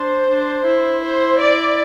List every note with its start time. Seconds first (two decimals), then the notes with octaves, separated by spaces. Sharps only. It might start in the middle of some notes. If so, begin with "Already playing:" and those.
Already playing: D4 C5
0.30 D4
0.66 E4
1.03 C5
1.41 D5